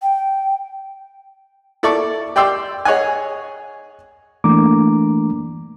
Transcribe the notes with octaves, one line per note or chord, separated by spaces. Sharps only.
G5
E4 A4 D5 A5 C#6 D6
G4 D5 G5 C6 E6
G#4 C#5 D#5 F#5 G#5
E3 A3 A#3 D4 A#5 D6